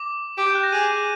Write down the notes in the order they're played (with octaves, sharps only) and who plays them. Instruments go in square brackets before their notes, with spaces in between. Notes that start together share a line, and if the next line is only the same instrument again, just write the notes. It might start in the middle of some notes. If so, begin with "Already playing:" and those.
Already playing: [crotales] D6
[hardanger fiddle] G4 [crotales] D6
[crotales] G6
F#6
A#6
[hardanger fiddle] G#4 [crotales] D#7